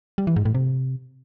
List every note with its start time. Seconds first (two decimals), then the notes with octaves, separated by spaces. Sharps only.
0.18 G3
0.27 E3
0.36 G#2
0.45 A2
0.55 C3